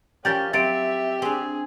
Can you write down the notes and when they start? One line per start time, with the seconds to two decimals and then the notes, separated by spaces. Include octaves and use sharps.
0.25 F3 C#4 G4 A#4 D5 G5 G6 A6
0.53 F#3 C4 G4 E5 A6 D7
1.22 C4 D4 G#4